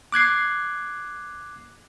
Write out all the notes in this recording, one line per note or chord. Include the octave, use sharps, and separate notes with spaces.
D6 F#6 G#6 C7